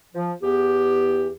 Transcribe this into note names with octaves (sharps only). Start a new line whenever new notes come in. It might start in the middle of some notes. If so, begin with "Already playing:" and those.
F3
E2 B3 G4